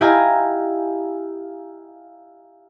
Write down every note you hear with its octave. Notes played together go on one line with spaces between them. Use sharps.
E4 G4 D#5 F5 G#5 A#5